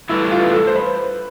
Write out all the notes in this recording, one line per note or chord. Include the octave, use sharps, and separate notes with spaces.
G2 E3 A3 D4 E4
F4
A4
C5
B4